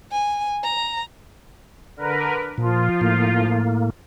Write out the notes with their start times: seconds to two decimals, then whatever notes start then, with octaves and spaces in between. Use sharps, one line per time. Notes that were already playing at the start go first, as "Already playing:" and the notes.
0.12 G#5
0.64 A#5
1.97 D3 A#4 B4
2.58 A#2 F3 F4
3.01 A2 A#3